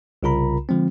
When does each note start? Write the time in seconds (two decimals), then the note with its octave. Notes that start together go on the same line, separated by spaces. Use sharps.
0.23 C2 C#3 F4 A#4 A#5 B5
0.69 D3 F3 G#3 C4